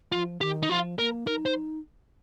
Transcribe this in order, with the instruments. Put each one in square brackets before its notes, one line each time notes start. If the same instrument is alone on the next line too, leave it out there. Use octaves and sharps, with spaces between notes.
[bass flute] F3 [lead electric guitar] F4
[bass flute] D#3 [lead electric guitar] G4
[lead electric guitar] D#4
[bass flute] F3 [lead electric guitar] F4
[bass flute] A#3 [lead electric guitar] A#4
[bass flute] D#4 [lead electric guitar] A#4
[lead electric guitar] C5